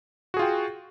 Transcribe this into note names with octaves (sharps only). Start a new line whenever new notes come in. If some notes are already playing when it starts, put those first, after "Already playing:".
F4 F#4 G#4 G5